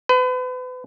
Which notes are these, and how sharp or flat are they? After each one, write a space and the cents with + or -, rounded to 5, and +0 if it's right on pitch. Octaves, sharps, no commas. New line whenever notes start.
B4 +40